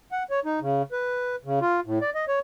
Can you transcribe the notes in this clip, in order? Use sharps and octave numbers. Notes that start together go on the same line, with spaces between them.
F#5
C#5
D#4
C#3
B4
C#3
F4
A2
D5
D#5
C#5